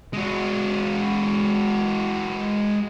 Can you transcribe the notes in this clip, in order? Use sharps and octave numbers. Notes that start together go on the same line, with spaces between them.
G#3 F#4